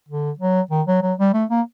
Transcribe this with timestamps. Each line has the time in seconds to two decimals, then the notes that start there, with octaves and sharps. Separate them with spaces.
0.09 D3
0.39 F#3
0.71 D#3
0.87 F#3
1.02 F#3
1.19 G3
1.33 A3
1.50 A#3